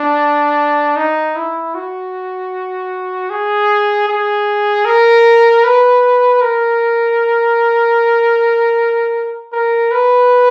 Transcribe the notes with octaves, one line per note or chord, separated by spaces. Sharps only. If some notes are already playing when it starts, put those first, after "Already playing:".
Already playing: D4
D#4
E4
F#4
G#4
G#4
A#4
B4
A#4
A#4
B4